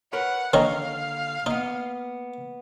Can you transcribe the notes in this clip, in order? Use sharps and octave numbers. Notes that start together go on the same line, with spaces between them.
A#4 B4 C#5 F#5
D3 D#3 A#3 C#4 D#4 F5 A#5
A#3 B3 D#4